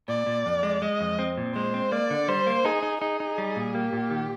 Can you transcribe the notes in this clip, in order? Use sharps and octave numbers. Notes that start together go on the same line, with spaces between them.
A#2 D5
A#2
F2
G#3
G#3 D#5
F2
C4
A#2
G#3 C5
C4
A#3 D5
D3
G3 C5
A#3
D#4 G#4
D#4
D#4 G#4
D#4
G3
A#2
A#3 G4
A#2
D#3